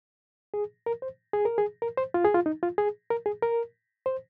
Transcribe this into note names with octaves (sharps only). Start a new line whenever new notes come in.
G#4
A#4
C5
G#4
A#4
G#4
A#4
C5
F4
G#4
F4
D#4
F4
G#4
A#4
G#4
A#4
C5